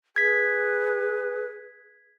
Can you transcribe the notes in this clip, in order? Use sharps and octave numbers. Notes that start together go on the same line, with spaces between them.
G#4 B4 G#6 B6